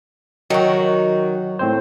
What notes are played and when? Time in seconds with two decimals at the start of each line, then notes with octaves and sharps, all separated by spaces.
0.50 D#3 F#3 F#4
1.59 A2 C4 C5